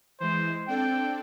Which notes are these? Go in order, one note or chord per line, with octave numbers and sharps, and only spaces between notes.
E3 G#3 C5
C4 D4 A4 G5